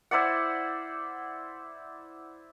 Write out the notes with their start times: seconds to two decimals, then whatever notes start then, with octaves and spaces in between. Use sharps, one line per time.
0.11 E4 C5 D5 F#5